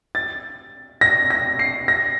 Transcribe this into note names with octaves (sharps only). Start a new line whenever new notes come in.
A6
A#6
A#6
C7
A#6